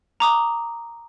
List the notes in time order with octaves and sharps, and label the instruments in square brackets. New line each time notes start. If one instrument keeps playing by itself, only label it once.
[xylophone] A#5 D6 D#6